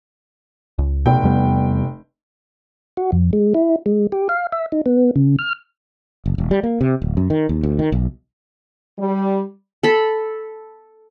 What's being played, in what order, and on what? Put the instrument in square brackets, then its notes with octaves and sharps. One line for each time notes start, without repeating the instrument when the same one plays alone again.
[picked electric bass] C#2
[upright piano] F1 G5 [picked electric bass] B2
[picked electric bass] E2 G3 B3
[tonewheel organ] F#4
F2
G#3
E4
G#3
G4
F5
E5
D#4
B3
C#3
F6
[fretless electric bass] F#1
E1
G3
A#3
C3
D1
F#2
D#3
D#2
D2
D#3
B1
[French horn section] G3
[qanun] A4 B5